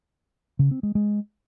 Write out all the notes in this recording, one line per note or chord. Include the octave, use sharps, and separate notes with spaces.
C#3
C4
G#3
G#3